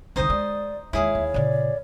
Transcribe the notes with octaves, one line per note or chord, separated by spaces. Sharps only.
C2 D#3 D#4 C5 D#5
G#3 D5
D#2 G#3 E4 G#4 C#5 E5 F5
D#2
A#2 C#3 D5